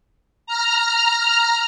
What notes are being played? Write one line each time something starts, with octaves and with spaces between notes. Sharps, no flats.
A#5 F6